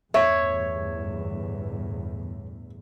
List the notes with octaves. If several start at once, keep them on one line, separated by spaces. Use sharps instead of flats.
G1 E2 A2 C#5 E5